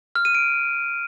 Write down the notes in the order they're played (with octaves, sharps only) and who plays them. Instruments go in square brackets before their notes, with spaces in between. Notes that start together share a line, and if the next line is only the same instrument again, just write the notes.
[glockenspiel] F6
D#7
D7